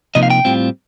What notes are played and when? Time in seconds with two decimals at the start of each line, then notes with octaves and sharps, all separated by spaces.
0.15 C3 F3 A#3 D#4 D#5
0.23 F5
0.30 G5
0.45 A2 G3 C4 F4